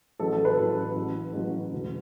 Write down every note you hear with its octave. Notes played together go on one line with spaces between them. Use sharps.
A1 A2 F#3 A4
A4
B4
A1 A2 F#3
A1 A2 F#3
A1 A2 F#3
E1 D2 D3